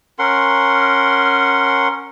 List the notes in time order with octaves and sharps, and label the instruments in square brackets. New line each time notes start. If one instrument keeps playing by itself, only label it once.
[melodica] C#4 A#4 F#5 C6